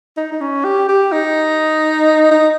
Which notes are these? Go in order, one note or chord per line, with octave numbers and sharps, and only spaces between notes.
D#4
D#4
C#4
G4
G4
D#4
D#4